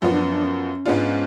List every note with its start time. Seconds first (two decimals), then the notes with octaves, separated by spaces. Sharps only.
0.02 F#2 F3 B3 F4
0.12 D4
0.22 C#4
0.32 D4
0.44 C#4
0.86 G#2 G#3 B3 D4 F4